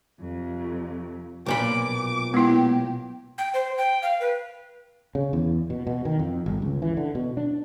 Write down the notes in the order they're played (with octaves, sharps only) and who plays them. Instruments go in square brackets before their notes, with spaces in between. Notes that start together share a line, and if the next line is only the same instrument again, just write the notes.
[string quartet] F2 C3
[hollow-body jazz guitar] B1 A#2 B5 [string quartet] D6
[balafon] G#3 E4 [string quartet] A#3 G4 [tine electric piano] B3
[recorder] G5
C5
G5
F5
B4
[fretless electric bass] C#3
E2
B2
B2
D#3
F2
G1
C#2
E3
D3
B2
D4